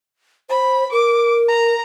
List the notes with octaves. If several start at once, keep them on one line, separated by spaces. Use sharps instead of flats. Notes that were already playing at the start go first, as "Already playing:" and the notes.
C5 B5
A#4 D6
A#5